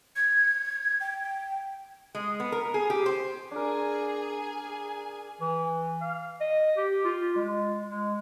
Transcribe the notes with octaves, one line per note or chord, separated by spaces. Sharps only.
G#6
G5
G#3
B3
A#4
G#4
G4
C5
D4 G#4 A#4 G#5
E3
F5
D#5
G4
F4
G#3
G#3